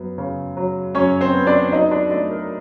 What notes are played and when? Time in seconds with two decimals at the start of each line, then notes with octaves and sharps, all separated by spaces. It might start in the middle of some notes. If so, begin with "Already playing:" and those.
Already playing: F#2 B3
0.18 C#3
0.57 F#3
0.95 F#2 C#4 C#5
1.21 C4 C5
1.34 B3
1.47 D4 D5
1.72 F#3 D#4 D#5
1.91 D4 D5
2.10 A3 D4 D5
2.31 A#4